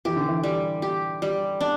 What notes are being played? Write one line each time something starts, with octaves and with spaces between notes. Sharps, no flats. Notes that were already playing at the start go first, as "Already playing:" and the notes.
E3 G4
D3
E3
G3
G4
G3
D4